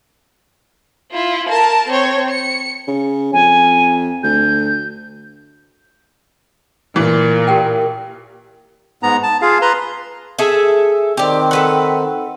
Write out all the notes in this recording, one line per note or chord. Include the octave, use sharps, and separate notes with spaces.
E4 F4
A#4 A5
C4 C#5
C#7
C#3
F2 G#5
D2 G6
A#2 E3
G4 A#4 G5
G#2 B3 A#5
A5
F4 G#4 F5
B4 A#5 C6
G#4 A4 E5
D#3 C4 G4 D5
A4 B4 F#5